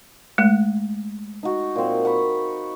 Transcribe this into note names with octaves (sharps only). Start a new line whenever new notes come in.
G#3 A3
D#4 F#4
A#2 C4
F#5 B5 C#6